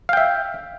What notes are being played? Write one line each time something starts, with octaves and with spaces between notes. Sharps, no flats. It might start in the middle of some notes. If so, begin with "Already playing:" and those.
E5 F5 G5